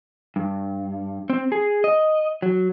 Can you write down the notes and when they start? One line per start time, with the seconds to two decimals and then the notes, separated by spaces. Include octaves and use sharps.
0.36 G2
1.30 C4
1.52 G#4
1.84 D#5
2.42 F#3